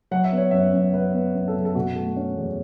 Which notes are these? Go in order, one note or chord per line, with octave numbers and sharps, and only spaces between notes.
F#3 F#5
E5
B3
C#5
F#2 E5
F#2
F#3 B4
B3
F#2
A4
F#2
A4
B2 F#4
A3
C#4
E2